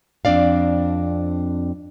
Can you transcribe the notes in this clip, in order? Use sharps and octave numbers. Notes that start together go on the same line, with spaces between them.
F2 C4 D4 D5 F5